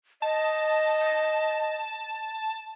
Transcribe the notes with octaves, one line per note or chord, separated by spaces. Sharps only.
D#5 A5